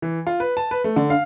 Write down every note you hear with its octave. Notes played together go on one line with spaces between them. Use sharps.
E3
F4
B4
A5
B4
A3
D3
F5